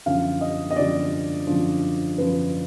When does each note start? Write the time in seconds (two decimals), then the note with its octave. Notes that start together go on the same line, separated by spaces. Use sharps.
0.06 F#2 D3 F3 F5
0.41 D#5
0.71 D#5
0.76 F#2 D3 F3 D5
1.47 F#2 D3 F3
2.18 F#2 D3 F3 B4